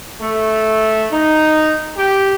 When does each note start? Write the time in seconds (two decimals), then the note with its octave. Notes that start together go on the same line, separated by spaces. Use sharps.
0.20 A3
1.11 D#4
1.97 G4